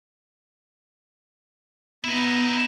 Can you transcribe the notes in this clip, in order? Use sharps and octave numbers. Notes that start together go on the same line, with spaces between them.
B3 D#4 E4